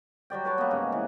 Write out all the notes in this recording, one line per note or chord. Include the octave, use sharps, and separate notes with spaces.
F#3 G3 D5 G5
B4 C#5 A5
A#3 B3
G#2 C#3
E3